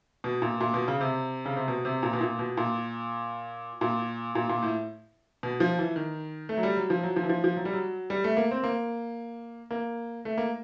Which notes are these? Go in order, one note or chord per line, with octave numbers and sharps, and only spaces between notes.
B2
A#2
A#2
B2
C#3
C3
C#3
C3
B2
C3
A#2
B2
A#2
B2
A#2
A#2
A#2
A#2
A2
B2
F3
E3
D#3
A3
F#3
G3
F#3
F3
F#3
F3
E3
F3
F3
F#3
G3
F#3
G3
A3
A#3
C4
A#3
A#3
A3
A#3